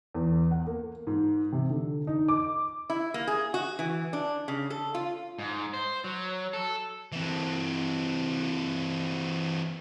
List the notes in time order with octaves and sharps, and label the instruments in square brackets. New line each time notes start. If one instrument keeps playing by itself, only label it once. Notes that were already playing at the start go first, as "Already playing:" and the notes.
[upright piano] E2
F#5
A#3
G#2
C3
D3
D#4
D6
[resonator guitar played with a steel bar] E4
A#3
G#4
F#4
E3
D4
C#3
A4
F4
[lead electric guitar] G#2
C5
F#3
A4
[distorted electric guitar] E3 C4